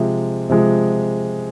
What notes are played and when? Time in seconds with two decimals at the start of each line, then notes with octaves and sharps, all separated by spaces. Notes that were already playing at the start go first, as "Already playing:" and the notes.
Already playing: C3 F3 G#3
0.50 C3 F3 G#3